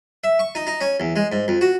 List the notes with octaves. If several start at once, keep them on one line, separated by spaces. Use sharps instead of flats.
E5
C#6
D#4
D#4
C#4
E2
G#3
G#2
F2
F#4